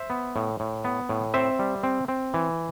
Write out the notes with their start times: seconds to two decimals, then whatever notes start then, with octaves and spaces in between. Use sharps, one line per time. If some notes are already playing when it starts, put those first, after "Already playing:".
Already playing: C5 E5
0.10 B3
0.36 A2
0.60 A2
0.85 B3
1.09 A2
1.34 C4 C5 E5
1.59 G3
1.83 C4
2.08 C4
2.34 E3